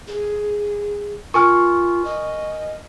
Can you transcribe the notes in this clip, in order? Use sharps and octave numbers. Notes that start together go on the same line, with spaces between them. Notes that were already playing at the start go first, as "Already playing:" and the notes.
G#4
F4 A#4 G#5 C#6 F6
D#5